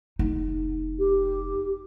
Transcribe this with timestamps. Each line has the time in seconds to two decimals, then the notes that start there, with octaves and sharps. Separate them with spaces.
0.19 F1 D#4
0.98 G4